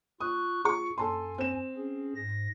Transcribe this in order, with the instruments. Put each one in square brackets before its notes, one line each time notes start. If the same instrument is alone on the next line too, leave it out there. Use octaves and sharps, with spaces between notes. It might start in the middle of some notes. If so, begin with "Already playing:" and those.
[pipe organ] F4 C#6 F#6 [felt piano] D#6
[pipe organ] F4 [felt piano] G#4 C#6
[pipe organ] F#2 G#5 [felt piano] A4 A5 C6
[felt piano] C4 E7
[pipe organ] C#4 G#4
G#2 A#6